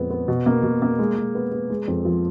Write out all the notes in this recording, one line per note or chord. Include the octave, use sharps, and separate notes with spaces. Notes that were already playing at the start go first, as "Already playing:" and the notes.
Already playing: F2 A#2 G#3 B3
B3
B2
A#3
B2
A#3
G#3
G#3
B3
B3
G#3
F2
F3